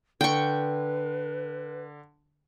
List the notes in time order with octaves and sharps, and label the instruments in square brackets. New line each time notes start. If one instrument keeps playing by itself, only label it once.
[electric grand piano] D3 [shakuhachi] B4 [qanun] G5 C#6